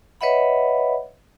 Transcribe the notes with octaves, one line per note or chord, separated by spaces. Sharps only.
B4 C#5 D#5 E5 F#5 B5